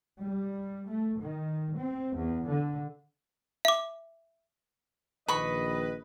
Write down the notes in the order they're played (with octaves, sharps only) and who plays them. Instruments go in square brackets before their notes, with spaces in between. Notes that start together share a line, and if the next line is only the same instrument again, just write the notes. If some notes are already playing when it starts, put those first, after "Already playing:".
[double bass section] G3
A3
D#3
C4
E2
D3
[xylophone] E5 D6
[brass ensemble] A#1 D#3 [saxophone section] B4 [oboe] D#5 [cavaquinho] B5 C#6